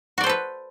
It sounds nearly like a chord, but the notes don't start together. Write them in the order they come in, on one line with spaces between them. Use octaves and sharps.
F#4 D5 C5 A4 B4